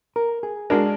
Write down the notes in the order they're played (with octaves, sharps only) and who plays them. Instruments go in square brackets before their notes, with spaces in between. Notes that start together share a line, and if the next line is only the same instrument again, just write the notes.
[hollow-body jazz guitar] A#4
G#4
[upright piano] G#3 D4 F#4 A#4